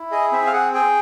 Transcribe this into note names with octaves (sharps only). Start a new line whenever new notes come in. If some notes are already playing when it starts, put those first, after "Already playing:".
Already playing: E4
G#4 D#5
C4 E5
F5
G#4 F#5
G#4 G5